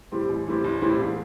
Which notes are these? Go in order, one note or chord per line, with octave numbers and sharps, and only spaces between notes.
A2 E3 G3 C4
A1
A2 E3 G3 C4
A1
A2 E3 G3 C4
E1